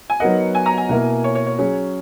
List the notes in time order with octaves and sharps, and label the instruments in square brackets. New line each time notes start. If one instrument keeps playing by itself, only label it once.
[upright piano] G#5
[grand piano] F#3 B3 D#4 A#4 D#5 [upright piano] F#5
[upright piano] G#5
A#5
G#5
[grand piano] B2 A#3 E4 A#4
[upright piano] C#5
C#5
C#5
[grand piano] F#3 C#4 G#4